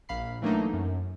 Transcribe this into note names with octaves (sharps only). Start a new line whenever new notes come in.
A#1 F5 B5 C7
E3 F#3 A3 A#3 D4 D#4
F#2